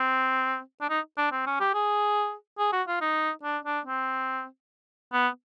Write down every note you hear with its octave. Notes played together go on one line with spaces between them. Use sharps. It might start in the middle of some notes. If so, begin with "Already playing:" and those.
Already playing: C4
D4
D#4
D4
C4
C#4
G4
G#4
G#4
F#4
F4
D#4
D4
D4
C4
B3